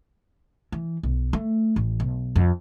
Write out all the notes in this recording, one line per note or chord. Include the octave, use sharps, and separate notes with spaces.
E3
B1
A3
A1
B1
F2